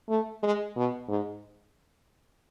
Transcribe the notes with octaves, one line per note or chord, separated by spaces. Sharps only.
A3
G#3
B2
G#2